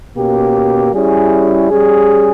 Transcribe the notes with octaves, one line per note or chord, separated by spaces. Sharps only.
B2 A#3 C#4 G4
G3 C#4 E4 G#4
G3 C#4 G#4